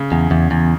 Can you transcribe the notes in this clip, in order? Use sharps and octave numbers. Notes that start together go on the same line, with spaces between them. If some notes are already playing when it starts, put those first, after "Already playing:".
Already playing: C#3
E2
E2
E2